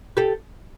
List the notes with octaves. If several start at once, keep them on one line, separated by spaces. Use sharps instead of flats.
G4 A4